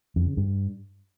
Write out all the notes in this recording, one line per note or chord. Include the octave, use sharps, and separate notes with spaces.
F2
C#3
G2